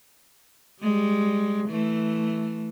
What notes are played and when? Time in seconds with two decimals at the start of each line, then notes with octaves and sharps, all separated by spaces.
0.81 G3 G#3
1.69 E3 A3